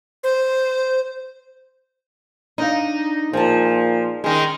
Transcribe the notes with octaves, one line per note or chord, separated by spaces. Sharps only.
C5
D4 D#4 F5
A#2 F3 G#4 G#5 A5
D#3 G#3 C#4